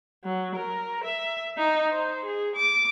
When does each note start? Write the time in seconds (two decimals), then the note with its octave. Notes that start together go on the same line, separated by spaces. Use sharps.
0.25 F#3
0.55 A#4
1.04 E5
1.58 D#4
1.92 C5
2.25 G#4
2.56 D6